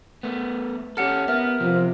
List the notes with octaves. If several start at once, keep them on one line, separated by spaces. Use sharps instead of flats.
A3 B3
C#4 G4 A4 F#5 F6
B3 A#4 E5
C3 F3